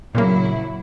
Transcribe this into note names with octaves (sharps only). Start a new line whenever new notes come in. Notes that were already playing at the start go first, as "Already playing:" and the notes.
A#2 C#3 F#3 A#3 E4